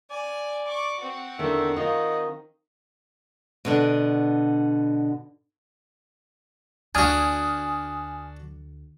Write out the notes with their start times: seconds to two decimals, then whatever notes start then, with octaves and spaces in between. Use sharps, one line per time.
0.11 D5 G#5
0.66 C#6 D6
1.00 C4 F#4
1.39 E2 D3 D#3 E5
1.76 D#3 F4 D#5
3.65 B2 D3 D4
6.95 D2 D4 F#4 G#5 D#6 F6